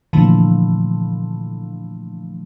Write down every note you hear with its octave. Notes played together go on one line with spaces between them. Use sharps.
A#2 D3 E3 F3 A3